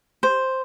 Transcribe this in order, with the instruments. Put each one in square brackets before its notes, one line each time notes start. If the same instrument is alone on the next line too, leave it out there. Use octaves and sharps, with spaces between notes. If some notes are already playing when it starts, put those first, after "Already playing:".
[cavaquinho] C5